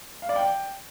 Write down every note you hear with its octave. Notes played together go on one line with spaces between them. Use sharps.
F5
D5
G5